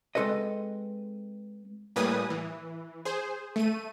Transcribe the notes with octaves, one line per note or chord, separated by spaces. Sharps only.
G#3 C4 G4 A4 B4 D#5
A2 G3 A#3 B4 G#5 D#6
E3
G#4 C5
A3 D#7